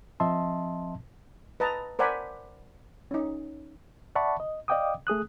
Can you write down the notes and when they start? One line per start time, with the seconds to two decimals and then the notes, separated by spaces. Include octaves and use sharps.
0.20 F3 C4 D#5 E5 A5 C6
1.60 B4 D#5 A5 A#5
1.99 A#4 C5 D5 F#5 G#5 B5
3.11 C#4 D#4
4.16 D5 E5 F#5 A5 B5 C#6
4.40 D#5
4.68 D5 D#5 F5 G5 D6 D#6
5.07 A3 G#4 D#6 F#6